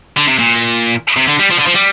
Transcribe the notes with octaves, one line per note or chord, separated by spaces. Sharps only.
D3
C3
A#2
C3
D3
G3
F3
D3
F3
G3